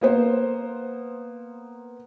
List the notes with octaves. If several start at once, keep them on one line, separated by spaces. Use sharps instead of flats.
A#3 B3 C5